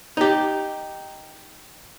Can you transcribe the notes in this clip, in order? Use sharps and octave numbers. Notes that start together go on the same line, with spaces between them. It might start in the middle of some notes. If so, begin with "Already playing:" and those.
D#4 G4